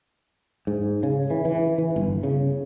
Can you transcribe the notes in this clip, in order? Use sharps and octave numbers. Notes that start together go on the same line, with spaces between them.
G#2
C#3
E3
E3
E3
G1
C#3